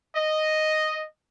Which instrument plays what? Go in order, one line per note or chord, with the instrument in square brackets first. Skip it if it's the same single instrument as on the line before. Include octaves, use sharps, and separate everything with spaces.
[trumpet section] D#5